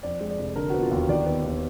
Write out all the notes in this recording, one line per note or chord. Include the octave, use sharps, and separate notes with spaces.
F2 D5
G#3
D5
F1
D3 A#4
B3 F#4
F4
D#2 F#4
D#3 D5
B3
D#2